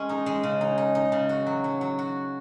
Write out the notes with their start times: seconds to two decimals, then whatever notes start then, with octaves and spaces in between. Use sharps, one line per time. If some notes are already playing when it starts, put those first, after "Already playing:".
Already playing: G#3 C#4
0.09 D#4
0.26 G#3
0.43 C#3
0.61 D#4
0.78 D#4
0.95 D#4
1.12 C#3
1.29 F#4
1.47 F#3
1.64 F#3
1.81 F#3
1.99 F#4